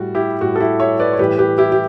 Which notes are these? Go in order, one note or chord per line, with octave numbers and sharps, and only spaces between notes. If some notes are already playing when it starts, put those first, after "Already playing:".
Already playing: A2 G3 F#4
E4 G4
A2 G3 F#4
A4
E4 G4
C#5 E5
B4 D5
C#5
A2 E3 G3 G4 B4
G4 B4
E4 G4
G4